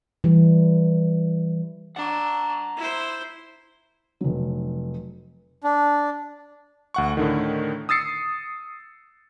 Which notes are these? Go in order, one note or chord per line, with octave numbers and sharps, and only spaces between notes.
E3 G3
D4 F#5 A#5
E4 C5
F1 F#3
D4
D2 F#5 C#6
A2 D3 D#3
D#6 E6 A6 C7 C#7